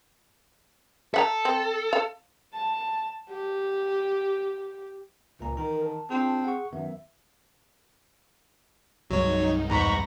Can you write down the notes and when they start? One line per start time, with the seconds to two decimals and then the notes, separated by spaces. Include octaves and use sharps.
1.14 A4 E5 F#5 A#5
1.45 C4
1.93 F5
2.54 A5
3.30 G4
5.40 C#2 A#2 A#5
5.57 D#3 E3 A#4 A#5
5.85 A5
6.10 C4 D4 F4 G#4
6.44 G#4 F#5 C#6
6.73 F#2 D#3 B3 E5
9.10 C2 G2 F#3 G#3 D#4 C#5
9.70 E2 G#2 A#5 B5 C#6 A#6